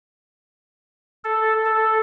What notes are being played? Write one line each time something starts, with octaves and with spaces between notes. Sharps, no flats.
A4
A4